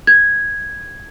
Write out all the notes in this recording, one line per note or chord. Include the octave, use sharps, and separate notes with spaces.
G#6